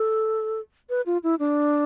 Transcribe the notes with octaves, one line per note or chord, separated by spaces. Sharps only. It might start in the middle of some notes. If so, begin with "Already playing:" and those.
Already playing: A4
B4
F4
E4
D4